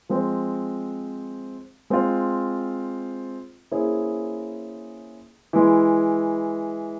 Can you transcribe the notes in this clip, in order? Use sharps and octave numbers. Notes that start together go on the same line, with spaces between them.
F3 G#3 C4
G#3 C4 F4
A#3 C#4 E4 G#4 C5
E3 G#3 E4